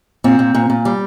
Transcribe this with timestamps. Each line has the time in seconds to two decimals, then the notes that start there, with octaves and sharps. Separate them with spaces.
0.24 A#2 C4
0.39 A#2
0.54 A#2
0.70 A#2
0.85 G3